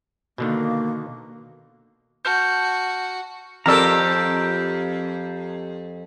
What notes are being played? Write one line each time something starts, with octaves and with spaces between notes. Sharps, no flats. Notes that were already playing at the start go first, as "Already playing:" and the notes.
B2 D3 D#3 A#3
F#4 A5 F6 G6
F2 G4 A4 A#4 D5 A#5 E6 F6